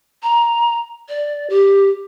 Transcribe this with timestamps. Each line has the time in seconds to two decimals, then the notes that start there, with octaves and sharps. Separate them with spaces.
0.23 A#5
1.09 D5
1.50 G4